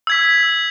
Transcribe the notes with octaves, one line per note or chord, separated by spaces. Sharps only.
E6 G#6 B6